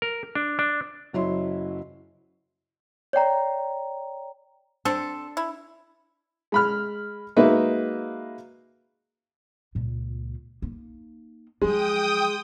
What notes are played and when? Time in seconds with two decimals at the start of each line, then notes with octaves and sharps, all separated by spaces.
0.02 A#4
0.35 D4
0.59 D4
1.13 F#1 F#3 E4 C6
3.13 C#5 D5 G5 A#5
4.85 C4 D4 A4
5.37 E4
6.52 G#3 B5 F6
7.37 G#3 A#3 D#4 F#4 B4 E5
9.75 C#2 A#2
10.62 A#3 D#4
11.62 F3 F#3 G#3 G5 D#6